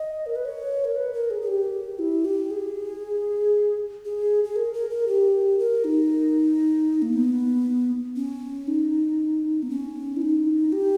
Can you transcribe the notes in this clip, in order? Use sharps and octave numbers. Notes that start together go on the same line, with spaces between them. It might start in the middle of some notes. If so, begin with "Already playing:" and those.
Already playing: D#5
A#4
B4
C#5
A#4
B4
A#4
G#4
G#4
G4
E4
G4
G#4
G#4
G#4
A#4
A#4
A#4
G4
A#4
D#4
A#3
B3
C#4
D#4
B3
C#4
E4
D#4
G4